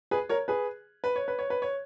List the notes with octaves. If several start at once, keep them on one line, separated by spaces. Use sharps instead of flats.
G#4 B4
A#4 C#5
G#4 B4
B4
C#5
B4
C#5
B4
C#5